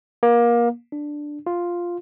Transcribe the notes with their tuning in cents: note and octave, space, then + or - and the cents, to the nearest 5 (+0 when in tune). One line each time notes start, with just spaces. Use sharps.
A#3 +25
D4 +5
F4 +0